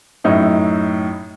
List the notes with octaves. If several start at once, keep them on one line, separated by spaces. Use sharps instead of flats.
F#2 A2 D#4 E4